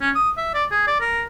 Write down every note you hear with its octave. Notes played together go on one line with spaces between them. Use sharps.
C#4
D#6
E5
D5
G#4
D5
A#4